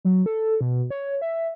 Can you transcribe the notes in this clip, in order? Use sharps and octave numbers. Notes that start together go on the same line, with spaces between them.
F#3
A4
B2
C#5
E5